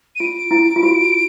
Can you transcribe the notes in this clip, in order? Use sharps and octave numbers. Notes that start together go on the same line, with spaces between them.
D#7
F4 D7
E4
F4
F#4